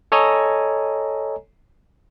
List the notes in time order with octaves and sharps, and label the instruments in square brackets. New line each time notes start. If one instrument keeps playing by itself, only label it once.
[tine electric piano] A4 C#5 D#5 G#5 A#5